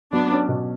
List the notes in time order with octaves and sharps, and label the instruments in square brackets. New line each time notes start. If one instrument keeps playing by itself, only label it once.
[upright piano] F#3 [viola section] B3 D4
[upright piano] C#4
B2